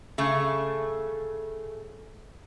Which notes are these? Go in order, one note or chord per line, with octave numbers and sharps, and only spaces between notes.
C#3 A3